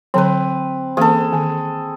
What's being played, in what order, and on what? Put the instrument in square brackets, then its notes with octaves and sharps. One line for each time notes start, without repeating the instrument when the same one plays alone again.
[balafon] D3 F#3 [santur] C4 B4
[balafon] E3 A#3 C#4 [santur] G#4 A4
[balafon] D#3